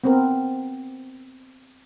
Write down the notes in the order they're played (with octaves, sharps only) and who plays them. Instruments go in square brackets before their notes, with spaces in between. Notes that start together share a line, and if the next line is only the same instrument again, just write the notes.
[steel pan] B3 C4 A#4